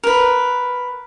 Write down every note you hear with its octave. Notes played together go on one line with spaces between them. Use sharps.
A#4 B4